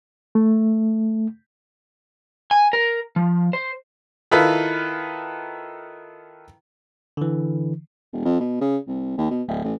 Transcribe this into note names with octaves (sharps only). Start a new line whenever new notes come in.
A3
G#5
A#4
F3
C5
D#3 E4 F4 A4 B4
D3 E3
E1
F2
B2
C#3
C2
D#2
B2
D1
A1